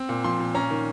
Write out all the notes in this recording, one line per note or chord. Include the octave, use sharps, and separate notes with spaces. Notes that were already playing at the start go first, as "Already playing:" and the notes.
Already playing: C4
A#2
F3 C6
A#2
C#4 A#5
D#3